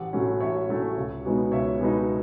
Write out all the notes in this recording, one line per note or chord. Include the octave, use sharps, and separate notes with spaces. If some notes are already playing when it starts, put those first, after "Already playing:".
Already playing: A1 F#5
A2 F#3 A3 C#4
A1 C#5 E5
A2 F#3 A3 C#4
C#2
B2 G#3 B3 D#4
C#2 C#5 E5
B2 G#3 B3 D#4